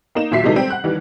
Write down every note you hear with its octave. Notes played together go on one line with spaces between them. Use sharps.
A#3 D#4 E7
D#2 A#2 F#3 E5 B6 C7
C3 E3 F#3 G#3 D#4 A4
G3 C4 G4
F#5 F#6
D#2 D#3 E3 G3